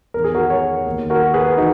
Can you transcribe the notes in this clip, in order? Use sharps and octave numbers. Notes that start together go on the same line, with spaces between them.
E2 D#3 A#4
G#4
F#4 A#4
A#4 C#5
D#2 D#3
F#4 A#4
G#4 B4
G#4
E3 D#4 F#4